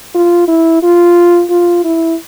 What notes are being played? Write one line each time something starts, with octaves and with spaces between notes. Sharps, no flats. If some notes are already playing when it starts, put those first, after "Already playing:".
F4
E4
F4
F4
E4